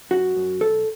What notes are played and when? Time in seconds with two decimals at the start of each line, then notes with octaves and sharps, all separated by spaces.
0.11 F#2 F#4
0.36 F#2
0.61 B1 A4